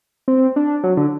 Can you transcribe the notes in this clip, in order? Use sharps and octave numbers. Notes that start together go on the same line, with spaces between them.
C4
D4
F#3
D3